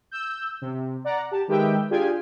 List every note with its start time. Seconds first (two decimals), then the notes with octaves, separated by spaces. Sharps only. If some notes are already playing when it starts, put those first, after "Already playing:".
0.11 E6 G6
0.62 C3
1.05 D5 F#5 A#5
1.31 G4 A5
1.48 D#3 G#3 G4 B4 E5 G5
1.90 D4 F4 G4 G#4 G5 G#5